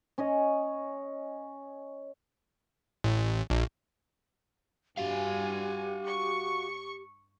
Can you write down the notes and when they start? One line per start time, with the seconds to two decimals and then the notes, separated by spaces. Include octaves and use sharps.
0.18 C#4 C#5 D#5
3.04 A1
3.50 A#1
4.98 G2 F#4 G4 F5 G#5
6.06 C#6